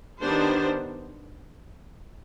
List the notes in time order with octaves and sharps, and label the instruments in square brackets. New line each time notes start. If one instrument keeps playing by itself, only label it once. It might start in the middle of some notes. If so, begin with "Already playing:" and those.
[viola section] D#3 B3 D4 G4 C5